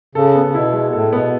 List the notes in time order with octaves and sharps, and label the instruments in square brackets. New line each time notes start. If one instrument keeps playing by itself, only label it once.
[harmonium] C#3 [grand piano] A4
[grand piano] B3
[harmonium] C#3
[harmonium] B2 [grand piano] E4
[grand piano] G#3
[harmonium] A2 [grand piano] A4
[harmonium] B2 [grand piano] B3